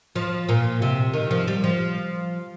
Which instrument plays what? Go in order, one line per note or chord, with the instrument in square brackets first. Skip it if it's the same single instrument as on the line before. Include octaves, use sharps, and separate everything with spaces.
[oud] F3
A#2
C3
D#3
F3
G3
F3